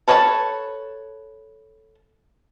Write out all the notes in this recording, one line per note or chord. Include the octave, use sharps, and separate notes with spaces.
A4 B4 C#5 D#5 A5